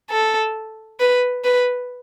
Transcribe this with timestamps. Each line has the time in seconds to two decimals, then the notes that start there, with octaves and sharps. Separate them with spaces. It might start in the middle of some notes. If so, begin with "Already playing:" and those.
0.10 A4
0.99 B4
1.44 B4